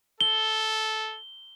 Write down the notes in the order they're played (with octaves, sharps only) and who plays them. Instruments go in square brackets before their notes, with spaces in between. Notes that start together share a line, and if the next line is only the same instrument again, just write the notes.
[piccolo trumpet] A4 [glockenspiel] G7